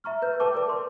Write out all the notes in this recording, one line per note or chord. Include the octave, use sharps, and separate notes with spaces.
E5 A#5 C#6 F6
B4 G6
A4 B4 G5 A5 C#6 D6
A#4 B4 D5 D6
C6